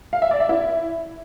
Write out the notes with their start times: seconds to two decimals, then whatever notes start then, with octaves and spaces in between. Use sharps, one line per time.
0.13 F5
0.22 E5
0.31 D5
0.40 E5
0.49 E4